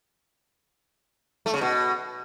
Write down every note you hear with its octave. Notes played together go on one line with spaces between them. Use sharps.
A3
C#3
B2